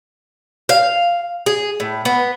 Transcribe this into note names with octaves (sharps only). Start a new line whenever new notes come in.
F5
G#4
A2
B3